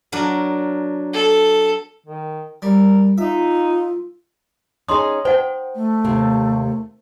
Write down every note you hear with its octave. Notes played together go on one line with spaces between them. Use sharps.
F#3 D4 A#4
A4
D#3
G3 A#4
D#4 F4 E5
C#4 D#4 G#4 C6 D#6
C5 F#5 G5
A3
D#2 C3 A#3